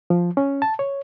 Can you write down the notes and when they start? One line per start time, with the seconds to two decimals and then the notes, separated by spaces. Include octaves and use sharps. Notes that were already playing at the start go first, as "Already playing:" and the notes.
0.10 F3
0.37 C#4
0.62 A5
0.79 C#5